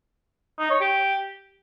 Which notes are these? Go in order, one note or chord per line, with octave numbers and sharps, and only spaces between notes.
D#4
C#5
G4